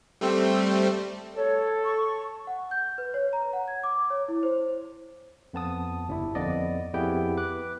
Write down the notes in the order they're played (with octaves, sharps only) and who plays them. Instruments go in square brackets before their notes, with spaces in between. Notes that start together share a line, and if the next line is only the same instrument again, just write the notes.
[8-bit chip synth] G3 A3 C4
[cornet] A4 [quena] C#5
[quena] C#6
[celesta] F#5
G6
B4
C#5
A#5
F#5
G#6
D6
C#5
E4
C5
[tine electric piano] F2 B3 A5 D#6
G1 D4 E4
F2 B3 D5 D#5
F2 B3 E4 G4 G#4 G5
B4 D6 F#6